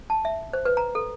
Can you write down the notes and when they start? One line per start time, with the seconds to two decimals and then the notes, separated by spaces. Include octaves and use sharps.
0.10 A5
0.25 E5
0.53 C5
0.65 B4
0.77 A#5
0.95 A4